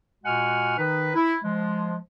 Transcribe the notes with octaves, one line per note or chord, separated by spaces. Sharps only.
A#2 G#3 F#4 F#5 G#5 F6
D#3 D#4 B4
E4
F3 G#3